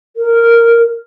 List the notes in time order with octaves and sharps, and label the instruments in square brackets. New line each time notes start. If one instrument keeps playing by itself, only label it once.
[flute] A#4